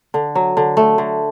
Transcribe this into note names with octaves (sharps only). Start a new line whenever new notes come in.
D3
F#3
D3
A3
D3